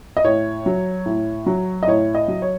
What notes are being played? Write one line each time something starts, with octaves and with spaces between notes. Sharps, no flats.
D#5
A2 C#5
F#3
A2
F#3
D#5
A2 C#5
D#5
F#3
C#5